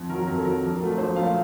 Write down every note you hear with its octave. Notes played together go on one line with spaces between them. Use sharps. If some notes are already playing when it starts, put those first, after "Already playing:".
Already playing: F2
D#3 F#3 A#4
F2 A#4
A4
D#3 F#3 A#4
A#1
A#2 F#3 A3
A#1 C5
A#2 F#3 A3 F5